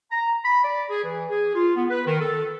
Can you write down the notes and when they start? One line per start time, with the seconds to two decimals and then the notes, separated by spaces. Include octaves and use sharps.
0.11 A#5
0.45 B5
0.64 D5
0.89 G#4
1.04 E3
1.30 G#4
1.55 F4
1.76 B3
1.90 B4
2.07 D#3
2.21 A4